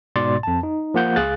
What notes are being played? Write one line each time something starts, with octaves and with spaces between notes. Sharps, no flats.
G#2 B2 D5 C6 A6
F2 A5
D#4
F3 A#3 F#5 G6
C#2 G#4 F5 F#6 A6